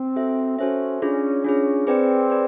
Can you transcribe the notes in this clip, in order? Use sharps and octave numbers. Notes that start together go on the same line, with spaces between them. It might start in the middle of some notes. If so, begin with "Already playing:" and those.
Already playing: C4
F#4 A4 C5 E5
C#4 F#4 A4 C5 E5
C#4 D4 F4 G#4
C#4 D4 F4 G#4
C4 G#4 B4 D5 G5
G#4 B4 D5